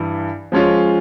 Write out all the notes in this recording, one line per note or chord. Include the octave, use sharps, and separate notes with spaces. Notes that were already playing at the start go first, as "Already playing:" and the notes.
Already playing: G2 E3 G3
F3 G#3 C#4 F4